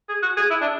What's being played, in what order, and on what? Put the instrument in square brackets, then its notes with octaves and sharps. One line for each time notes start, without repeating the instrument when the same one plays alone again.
[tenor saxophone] G#4
F#4
G#4
E4
D4